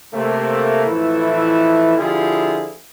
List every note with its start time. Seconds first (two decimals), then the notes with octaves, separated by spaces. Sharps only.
0.14 C3 A3 A#3
0.86 A1 F2 E3 A3 E4
1.98 D3 F3 E4 F4 G4 G#4